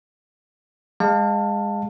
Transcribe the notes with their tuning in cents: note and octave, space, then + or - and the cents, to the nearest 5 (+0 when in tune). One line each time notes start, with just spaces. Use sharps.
G#3 -20 F5 +15 A5 +15